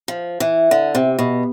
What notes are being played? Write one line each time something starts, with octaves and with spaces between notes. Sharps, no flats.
F3
E3
D3
C3
B2